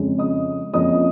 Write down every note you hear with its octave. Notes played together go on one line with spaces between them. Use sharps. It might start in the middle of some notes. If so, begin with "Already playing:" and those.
Already playing: F2 C#3 G#3 C#4
D#5 D#6
F2 F3 A#3 C#4 D#5 D#6